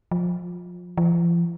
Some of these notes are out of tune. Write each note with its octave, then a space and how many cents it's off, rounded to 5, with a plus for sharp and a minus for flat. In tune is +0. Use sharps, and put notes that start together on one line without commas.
F3 +25
F3 -40